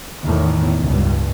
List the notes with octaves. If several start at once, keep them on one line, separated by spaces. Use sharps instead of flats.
E2 A2 D#3
C#2 G2